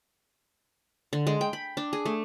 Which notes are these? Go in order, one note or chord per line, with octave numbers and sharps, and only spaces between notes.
D3
G#3
G5
B5
D4
G#4
A3